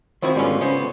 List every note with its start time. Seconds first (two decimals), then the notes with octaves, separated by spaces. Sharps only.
0.22 D#3 F3 C4 E4 F#4
0.35 G#2 D3 G3 B3 C#4 F4
0.61 C#3 B3 C#4 C5